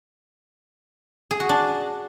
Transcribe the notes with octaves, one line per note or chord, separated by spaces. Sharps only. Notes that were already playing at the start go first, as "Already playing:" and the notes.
G#4
F#4
D4